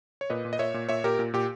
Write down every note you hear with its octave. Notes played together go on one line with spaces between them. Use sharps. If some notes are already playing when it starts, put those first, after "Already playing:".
C#5
A#2 B4 D#5
A#2
D#5
A#2 C#5 E5
A#2
A#2 C#5 E5
A#2 G4 A#4
A#2
A#2 G4